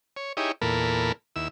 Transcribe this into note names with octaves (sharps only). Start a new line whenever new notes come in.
C#5
D#4 E4 G4 G#4 C#5
E2 A#2 A4 A#4 B5
D#2 E4 E6